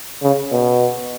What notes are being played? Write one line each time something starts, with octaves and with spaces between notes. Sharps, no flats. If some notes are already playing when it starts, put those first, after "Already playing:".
C#3
B2